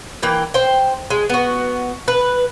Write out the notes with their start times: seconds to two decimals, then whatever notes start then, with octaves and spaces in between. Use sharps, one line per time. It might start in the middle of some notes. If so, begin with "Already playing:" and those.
0.23 E3 A#3 G5
0.54 C5 G5
1.10 G#3
1.29 B3 F#4
2.08 B4